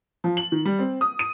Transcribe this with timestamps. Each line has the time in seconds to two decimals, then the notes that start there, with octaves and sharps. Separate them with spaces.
0.24 F3
0.37 F#7
0.52 D#3
0.65 G3
0.79 C4
1.01 D#6
1.19 D#7